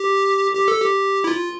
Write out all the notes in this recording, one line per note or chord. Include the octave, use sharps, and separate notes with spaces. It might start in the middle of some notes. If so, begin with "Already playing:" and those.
Already playing: G4
G4
A4
G4
E4
F4